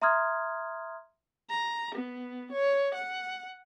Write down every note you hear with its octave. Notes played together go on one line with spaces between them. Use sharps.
E5 A#5 C6 D#6 F6 G#6
A#5
B3
C#5
F#5